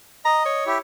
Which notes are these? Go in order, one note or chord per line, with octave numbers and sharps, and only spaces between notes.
D#5 A#5
C#5
E4 G4